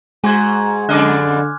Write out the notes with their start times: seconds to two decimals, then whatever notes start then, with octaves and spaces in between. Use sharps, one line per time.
0.24 G#2 G#3 F#4 G#5 C6 G#6
0.89 F2 D3 D4 D#5 D6 F6 F#6